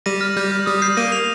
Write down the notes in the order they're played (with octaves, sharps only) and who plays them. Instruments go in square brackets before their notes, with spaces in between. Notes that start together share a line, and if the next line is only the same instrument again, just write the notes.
[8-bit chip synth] G3 [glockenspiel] A#6 D#7
[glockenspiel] F6 A#6
[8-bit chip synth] G3 [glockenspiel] G6
[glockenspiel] F6
[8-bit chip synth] G3 [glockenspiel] D#6
[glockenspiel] G6 C7
[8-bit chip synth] A#3 [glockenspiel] A#6 D#7
[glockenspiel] C7 F7